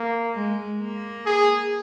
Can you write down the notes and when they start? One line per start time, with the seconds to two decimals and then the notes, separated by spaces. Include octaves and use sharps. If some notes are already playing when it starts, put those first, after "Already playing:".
Already playing: A#3
0.34 G#3
0.80 A#3
1.26 G#4